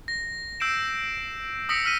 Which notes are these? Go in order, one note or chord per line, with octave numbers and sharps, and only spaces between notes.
A#6
E6 G6 C7 D7 E7
D#6 E6 A#6 B6 C#7 D7
E6 F6 B6 D#7